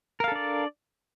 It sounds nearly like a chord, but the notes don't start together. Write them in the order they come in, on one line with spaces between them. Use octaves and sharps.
A#4 F5 A4 D4 D5